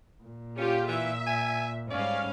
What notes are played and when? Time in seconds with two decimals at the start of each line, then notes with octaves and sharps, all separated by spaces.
0.23 A#2
0.58 C#4 F4 G4
0.89 E3 E5
1.27 G#5
1.91 G#2 G3 C#4 D5 F5